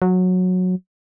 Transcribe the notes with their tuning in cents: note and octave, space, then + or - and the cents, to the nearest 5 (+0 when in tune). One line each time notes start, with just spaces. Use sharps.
F#3 -15